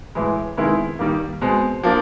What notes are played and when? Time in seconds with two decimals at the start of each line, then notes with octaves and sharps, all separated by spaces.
0.15 A2 E3 G#3
0.57 C3 D#3 G#3 B3 E4
0.99 D#3 G3 A#3
1.41 B2 G#3 C4
1.84 F3 A#3 D4